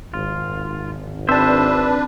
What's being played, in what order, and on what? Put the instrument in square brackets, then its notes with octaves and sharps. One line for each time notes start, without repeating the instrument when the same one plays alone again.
[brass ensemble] G#1 [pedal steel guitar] F4
[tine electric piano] C4 A5 [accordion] D4 B4 [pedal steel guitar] C5 E5